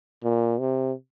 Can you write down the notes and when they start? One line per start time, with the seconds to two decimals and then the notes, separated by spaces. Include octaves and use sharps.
0.24 A#2
0.60 C3